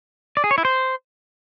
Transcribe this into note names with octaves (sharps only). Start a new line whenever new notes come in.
D5
G#4
C#5
E4
C5